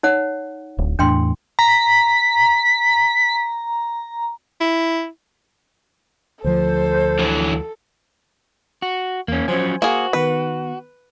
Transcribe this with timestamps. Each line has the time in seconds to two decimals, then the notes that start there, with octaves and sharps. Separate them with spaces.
0.03 D#4 C#5 F#5
0.78 D1
0.99 E2 A2 D4 G5 C6
1.59 A#5 B6
4.61 E4
6.44 D2 F3 A4 C5
7.19 D3 E3 F#3
8.82 F#4
9.28 E2 A#3 C#4
9.48 F3 F#3 C#4 C5 G#5
9.82 A#3 F#4 G#4
10.13 D#3 B3 B4